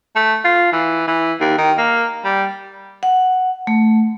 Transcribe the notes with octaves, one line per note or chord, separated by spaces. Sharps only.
A3
F4
E3
E3
D#2
D#3
A#3
G3
F#5
A3